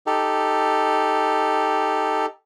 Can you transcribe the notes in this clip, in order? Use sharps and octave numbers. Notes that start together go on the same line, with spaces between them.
D#4 G4 A4